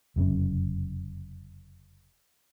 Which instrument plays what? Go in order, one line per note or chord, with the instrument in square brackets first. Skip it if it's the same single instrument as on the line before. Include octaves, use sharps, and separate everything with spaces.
[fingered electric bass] F1 F#2 C#3 C#4